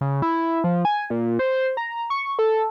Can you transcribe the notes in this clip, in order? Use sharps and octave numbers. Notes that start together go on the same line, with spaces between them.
C#3
E4
F3
G#5
A#2
C5
A#5
C#6
A4